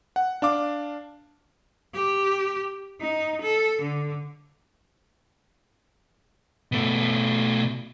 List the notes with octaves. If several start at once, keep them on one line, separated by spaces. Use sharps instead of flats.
F#5
D4 F5 D6
G4
D#4
A4
D3
B2 A3